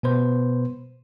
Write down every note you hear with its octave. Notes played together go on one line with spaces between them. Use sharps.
B2 B3 B4 C5